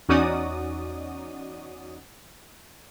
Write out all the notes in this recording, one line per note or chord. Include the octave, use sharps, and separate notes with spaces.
E2 C#4 D#4 F#4 D5 D#6